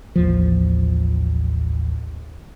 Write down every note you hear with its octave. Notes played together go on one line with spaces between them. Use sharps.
A1 D#2 F3